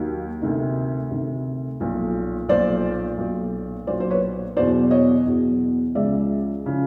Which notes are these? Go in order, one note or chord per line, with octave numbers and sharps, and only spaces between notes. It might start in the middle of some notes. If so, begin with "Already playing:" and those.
Already playing: D#2 D#3 F#3
D2 C3 D#3
D2 C3 D#3
B1 A#2 F3
B1 A#2 F3 C5 D5
B1 A#2 F#3
B1 A#2 F#3 C5 D5
C5
B4 C#5
E2 B2 F#3 C5 D5
C#5 D#5
E2 B2 F#3
C#2 C#3 F3 D5 E5
C#3 F3